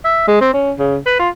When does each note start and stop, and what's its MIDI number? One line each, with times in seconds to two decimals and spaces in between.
0.05 0.24 76
0.28 0.41 56
0.41 0.52 60
0.54 0.73 61
0.78 0.97 49
1.06 1.18 71
1.19 1.29 65